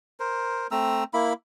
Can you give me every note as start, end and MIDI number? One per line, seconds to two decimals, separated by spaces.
0.20 0.67 70
0.20 0.67 72
0.71 1.04 57
0.71 1.04 60
0.71 1.04 82
0.71 1.04 88
1.14 1.33 58
1.14 1.33 64
1.14 1.33 83